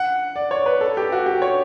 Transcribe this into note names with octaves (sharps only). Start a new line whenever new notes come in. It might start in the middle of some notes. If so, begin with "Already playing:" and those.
Already playing: F#5
D5
C#5
B4
A4
G4
F#4
G4
C#5